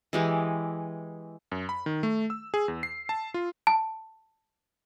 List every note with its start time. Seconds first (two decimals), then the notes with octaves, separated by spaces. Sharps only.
0.13 E3 G#3 G4
1.52 F#2
1.69 B5
1.86 D#3
2.03 A3
2.30 E6
2.54 G#4
2.68 E2
2.83 C7
3.09 A5
3.34 F4
3.67 A5